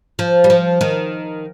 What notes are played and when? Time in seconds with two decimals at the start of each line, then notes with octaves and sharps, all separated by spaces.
0.19 F3
0.44 G3
0.50 F3
0.81 D#3